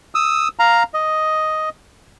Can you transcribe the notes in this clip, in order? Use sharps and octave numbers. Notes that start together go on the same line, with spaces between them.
D#6 E6
F5 A#5
D#5